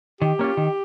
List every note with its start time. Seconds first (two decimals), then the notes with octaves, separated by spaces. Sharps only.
0.21 D#3 G4
0.39 A#3 C#4 F4
0.57 D#3